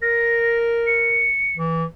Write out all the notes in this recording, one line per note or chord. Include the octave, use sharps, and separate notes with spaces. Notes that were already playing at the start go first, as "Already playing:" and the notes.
A#4 A#6
C#7
E3